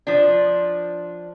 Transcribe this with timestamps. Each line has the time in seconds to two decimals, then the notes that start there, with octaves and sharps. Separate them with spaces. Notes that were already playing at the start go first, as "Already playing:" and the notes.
0.07 F3 D4